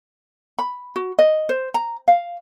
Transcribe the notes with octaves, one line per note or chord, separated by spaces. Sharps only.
B5
F#4
D#5
C5
A#5
F5